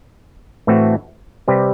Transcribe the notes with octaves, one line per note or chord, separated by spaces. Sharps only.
A2 E3 A3 C4 F#4
C3 G3 C4 G4 B4